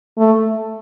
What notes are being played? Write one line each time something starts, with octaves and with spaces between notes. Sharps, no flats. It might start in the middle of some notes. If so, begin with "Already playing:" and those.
A3